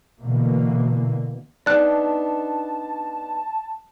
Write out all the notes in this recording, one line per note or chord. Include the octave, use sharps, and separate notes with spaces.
B2 D3 E3 A#3
B3 D4 D#4 D5 A5 F#6